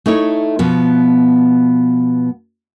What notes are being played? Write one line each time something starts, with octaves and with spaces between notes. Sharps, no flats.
A3 D#4 E4 C#5
B2 F3 B3